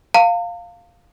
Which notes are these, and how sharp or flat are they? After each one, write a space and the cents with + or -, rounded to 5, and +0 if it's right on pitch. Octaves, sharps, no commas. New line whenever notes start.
F5 +0 A#5 -45